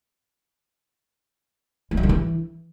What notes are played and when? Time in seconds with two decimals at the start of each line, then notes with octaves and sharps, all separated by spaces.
1.91 G#3
1.97 F#3
2.03 D3
2.09 E3